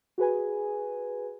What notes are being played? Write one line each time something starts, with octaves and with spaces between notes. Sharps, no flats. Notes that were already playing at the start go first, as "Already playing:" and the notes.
F#4 G#4 B4 G#5